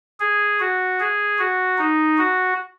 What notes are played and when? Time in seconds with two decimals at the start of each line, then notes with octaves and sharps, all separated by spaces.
0.20 G#4
0.60 F#4
1.00 G#4
1.39 F#4
1.79 D#4
2.18 F#4